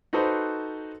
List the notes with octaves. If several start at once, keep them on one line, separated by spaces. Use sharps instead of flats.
D#4 F#4 A4 B4 C5